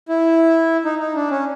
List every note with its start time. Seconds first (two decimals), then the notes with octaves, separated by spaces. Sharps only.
0.08 E4
0.85 D#4
0.99 D#4
1.15 D4
1.30 C#4